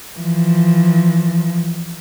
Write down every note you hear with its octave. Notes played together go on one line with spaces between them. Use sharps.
E3 F3